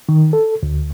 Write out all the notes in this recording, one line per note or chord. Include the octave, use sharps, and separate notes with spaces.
D#3
A4
D2